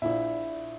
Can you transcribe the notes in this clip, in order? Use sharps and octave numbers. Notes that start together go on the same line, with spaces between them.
A#1 A#2 E4